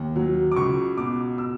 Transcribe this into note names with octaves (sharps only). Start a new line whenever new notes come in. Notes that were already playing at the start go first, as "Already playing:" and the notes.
Already playing: D#2
F#3
D6
C#2 C#6
B2 D6
E6